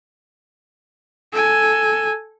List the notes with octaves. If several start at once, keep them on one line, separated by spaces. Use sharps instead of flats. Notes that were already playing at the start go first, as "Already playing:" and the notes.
A4 G#5